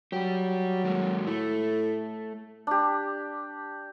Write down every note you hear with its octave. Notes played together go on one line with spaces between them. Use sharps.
F#3 G3 G4
D#3 G#3 A#3
A2 A3
D4 G4